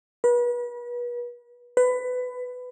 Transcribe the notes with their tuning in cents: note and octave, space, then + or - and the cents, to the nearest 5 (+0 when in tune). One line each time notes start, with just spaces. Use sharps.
B4 -35
B4 +20